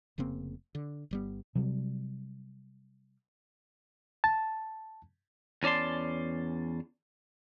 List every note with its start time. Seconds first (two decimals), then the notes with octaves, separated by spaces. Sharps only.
0.18 F1 C#3 A#3 C4
0.75 D3
1.11 G1 G3 B3
1.55 C3 F#3 G3
4.24 A5
5.63 E2 C#4 D5 A5 C6